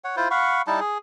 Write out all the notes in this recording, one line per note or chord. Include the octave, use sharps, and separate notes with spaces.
C#5 F#5
E4 F4 C5
F5 F#5 B5 C#6
G3 D#4 E4 A5
G#4